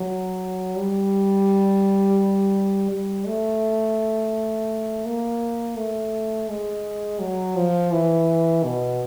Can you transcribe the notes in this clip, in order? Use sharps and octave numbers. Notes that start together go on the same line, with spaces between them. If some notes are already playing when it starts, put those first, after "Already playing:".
Already playing: F#3
G3
G3
A3
A#3
A3
G#3
F#3
F3
E3
B2